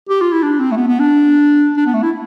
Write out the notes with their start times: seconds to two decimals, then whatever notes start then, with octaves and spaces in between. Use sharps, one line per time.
0.09 G4
0.21 F4
0.32 E4
0.43 D4
0.59 C4
0.72 A3
0.77 B3
0.88 B3
1.00 D4
1.77 D4
1.86 B3
1.94 A3
2.03 E4